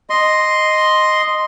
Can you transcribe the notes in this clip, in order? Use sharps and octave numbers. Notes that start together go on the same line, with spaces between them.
D#5 C6